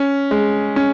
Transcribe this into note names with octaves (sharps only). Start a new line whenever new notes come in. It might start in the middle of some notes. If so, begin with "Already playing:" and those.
Already playing: C#4
G#3
C#4